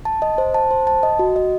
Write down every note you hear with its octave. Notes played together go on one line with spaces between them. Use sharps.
A5
D#5
C5
A5
C5
A5
D#5
F#4
D#5